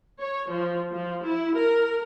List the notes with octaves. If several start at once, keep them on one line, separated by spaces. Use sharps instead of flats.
C#5
F3
F3
E4
A#4